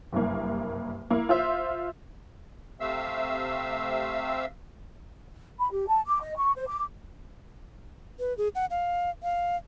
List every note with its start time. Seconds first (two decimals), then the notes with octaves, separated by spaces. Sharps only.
0.12 F#1 C2 G2 A#3
1.10 A#3 E4
1.29 F4 C5 E5
2.80 C3 A3 C4 E5 F5 E6
5.59 B5
5.71 G4
5.88 A5
6.06 D6
6.22 D#5
6.36 C#6
6.55 C5
6.67 D6
8.20 B4
8.38 G#4
8.55 F#5
8.71 F5
9.23 F5